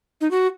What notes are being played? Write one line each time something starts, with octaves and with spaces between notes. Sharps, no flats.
D#4
F#4